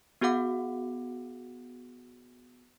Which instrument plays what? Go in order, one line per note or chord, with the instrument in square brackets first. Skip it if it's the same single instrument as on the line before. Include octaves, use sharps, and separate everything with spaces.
[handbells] B3 F#4 G#4 F5 F#5 D6